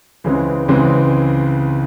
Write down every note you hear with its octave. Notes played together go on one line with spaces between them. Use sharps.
C#2 C#3 E3 G#3 C4
C#2 C#3 E3 G#3 C4